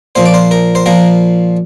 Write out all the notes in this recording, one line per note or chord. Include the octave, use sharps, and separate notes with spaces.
A#2 F3 C5
D5
C5
A#4
C5
A#2 F3 A#4